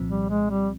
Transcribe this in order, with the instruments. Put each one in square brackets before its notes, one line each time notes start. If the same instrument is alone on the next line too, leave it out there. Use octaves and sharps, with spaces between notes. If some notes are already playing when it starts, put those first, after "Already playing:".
Already playing: [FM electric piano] C2 A#2 F3 C4
[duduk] G3
G#3
G3